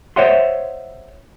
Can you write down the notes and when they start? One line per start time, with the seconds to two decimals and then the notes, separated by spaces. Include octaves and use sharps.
0.16 C5 C#5 D#5 E5 F#5 C6